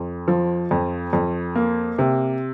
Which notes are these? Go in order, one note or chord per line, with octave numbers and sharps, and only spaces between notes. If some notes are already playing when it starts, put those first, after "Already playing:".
Already playing: F2
F3
F2
F2
A#3
C3